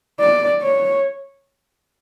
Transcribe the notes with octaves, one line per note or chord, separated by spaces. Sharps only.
D5
C#5